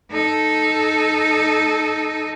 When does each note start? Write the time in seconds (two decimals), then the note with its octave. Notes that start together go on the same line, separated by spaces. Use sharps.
0.11 D#4 A4